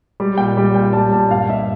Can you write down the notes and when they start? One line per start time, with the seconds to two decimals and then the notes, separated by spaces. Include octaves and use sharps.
0.20 G3
0.38 A#2 G5
0.57 G3
0.74 A#2 G5
0.93 G3 A5
1.12 A#2 A5
1.30 G2 F5
1.49 G2 E5